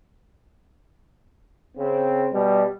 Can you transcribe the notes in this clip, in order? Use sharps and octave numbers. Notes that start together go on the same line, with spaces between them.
C#3 C4
B2 G3